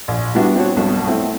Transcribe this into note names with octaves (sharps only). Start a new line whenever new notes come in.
A#1
G3 B3 D4 E4 F#4
C4 D4 F#4 C#5
B1 G2 B2
A3 C4 E4